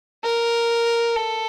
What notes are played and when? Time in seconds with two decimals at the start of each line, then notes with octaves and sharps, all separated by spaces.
0.23 A#4
1.17 A4